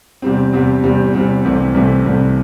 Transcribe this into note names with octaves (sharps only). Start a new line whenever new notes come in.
E2 C3 G3 C4
E2 C3 G3 C4
E2 C3 G3 C4
E2 C3 G3 C4
C2 C3 E3 A3 C4
C2 C3 E3 A3 C4
C2 C3 E3 A3 C4